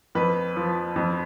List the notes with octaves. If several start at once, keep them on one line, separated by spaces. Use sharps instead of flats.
F2 B4
F3
F2